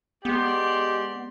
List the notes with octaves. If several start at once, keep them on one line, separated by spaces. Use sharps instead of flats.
G#3 B3 G4 D5 C6